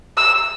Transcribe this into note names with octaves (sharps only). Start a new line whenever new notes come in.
E6